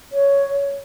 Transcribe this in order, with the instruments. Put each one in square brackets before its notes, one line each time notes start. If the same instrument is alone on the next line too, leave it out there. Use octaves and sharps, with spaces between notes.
[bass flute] C#5